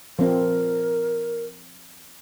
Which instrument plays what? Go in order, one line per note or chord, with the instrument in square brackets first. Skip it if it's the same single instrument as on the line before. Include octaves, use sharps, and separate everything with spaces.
[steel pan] F3 C4 [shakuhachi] A#4